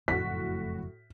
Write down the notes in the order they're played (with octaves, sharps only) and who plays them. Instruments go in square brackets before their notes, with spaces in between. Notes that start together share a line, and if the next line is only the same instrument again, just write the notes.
[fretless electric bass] F#1 F2 A3 [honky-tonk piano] A2 F#4 [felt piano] B6